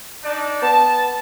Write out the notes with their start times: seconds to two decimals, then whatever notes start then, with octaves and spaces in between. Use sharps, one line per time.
0.23 D4 D#4 D5
0.62 B3 A5